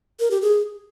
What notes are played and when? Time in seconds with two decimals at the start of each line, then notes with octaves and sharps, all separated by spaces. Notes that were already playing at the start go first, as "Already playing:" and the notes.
0.20 A#4
0.31 G4
0.42 G#4